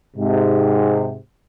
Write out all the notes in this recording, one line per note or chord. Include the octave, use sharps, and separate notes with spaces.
G#2 C3